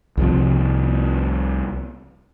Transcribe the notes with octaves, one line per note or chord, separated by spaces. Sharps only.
C2 C3 F3